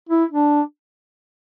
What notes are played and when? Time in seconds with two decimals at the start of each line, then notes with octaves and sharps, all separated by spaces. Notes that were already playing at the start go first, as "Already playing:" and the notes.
0.09 E4
0.31 D4